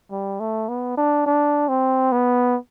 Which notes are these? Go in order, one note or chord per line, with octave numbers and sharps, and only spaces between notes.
G3
A3
B3
D4
D4
C4
B3